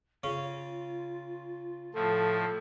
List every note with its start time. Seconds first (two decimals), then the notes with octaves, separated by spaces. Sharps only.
0.24 C#3 C#4 F4
1.94 A2 F3 A4